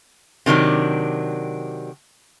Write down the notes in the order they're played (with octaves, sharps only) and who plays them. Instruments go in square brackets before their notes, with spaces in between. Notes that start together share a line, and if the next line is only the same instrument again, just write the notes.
[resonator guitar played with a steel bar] C3 D#3 F#3 D4